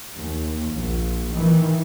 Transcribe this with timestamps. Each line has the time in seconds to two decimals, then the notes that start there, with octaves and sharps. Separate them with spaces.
0.15 D#2
0.73 A#1
1.31 D#3 E3